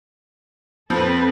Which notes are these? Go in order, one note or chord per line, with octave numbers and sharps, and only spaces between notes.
F2 F3 C4 A4 B4